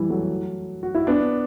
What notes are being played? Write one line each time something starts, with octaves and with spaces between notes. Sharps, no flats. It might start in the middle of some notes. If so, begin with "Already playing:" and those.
Already playing: E3 G3
F#3 A3
F#4
E4
B3 D4